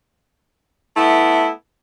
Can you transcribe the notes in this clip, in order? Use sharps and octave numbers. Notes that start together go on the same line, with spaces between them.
A3 B3 E4